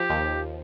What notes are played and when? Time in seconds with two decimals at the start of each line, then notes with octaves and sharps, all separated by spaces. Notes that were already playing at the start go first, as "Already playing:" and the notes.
Already playing: F3 G4
0.10 D#2